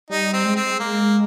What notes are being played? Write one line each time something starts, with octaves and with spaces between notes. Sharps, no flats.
G3 D#4
C4
G#3
C4
G#3
A#3